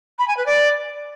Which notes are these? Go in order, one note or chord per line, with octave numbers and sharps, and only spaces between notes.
B5
G#5
B4
D5